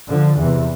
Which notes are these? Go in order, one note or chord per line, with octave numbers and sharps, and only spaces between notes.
D3 F3
E2 C3 E3